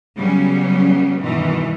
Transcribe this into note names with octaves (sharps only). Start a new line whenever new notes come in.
C#3 F#3 G3 B3 C#4
G2 B2 D#3 E3